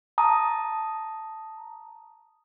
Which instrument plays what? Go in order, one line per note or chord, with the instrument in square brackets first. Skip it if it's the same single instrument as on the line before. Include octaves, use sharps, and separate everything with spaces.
[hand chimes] A5 A#5 D#6